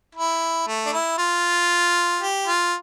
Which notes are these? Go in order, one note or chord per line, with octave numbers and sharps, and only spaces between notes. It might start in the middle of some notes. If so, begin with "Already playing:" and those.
E4
A3
D4
E4
F4
G4
F4